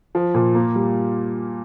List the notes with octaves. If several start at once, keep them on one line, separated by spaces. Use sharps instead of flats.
F3
A#2
A#3
G3